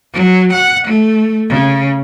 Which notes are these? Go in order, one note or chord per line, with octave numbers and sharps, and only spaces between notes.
F#3
F#5
A3
C#3